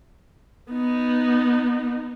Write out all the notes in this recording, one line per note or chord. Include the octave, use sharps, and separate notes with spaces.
B3 D#4